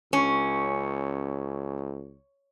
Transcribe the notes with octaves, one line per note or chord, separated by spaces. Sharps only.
C#2 C#4